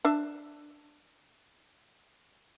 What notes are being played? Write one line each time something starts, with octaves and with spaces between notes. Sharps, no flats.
D4 E5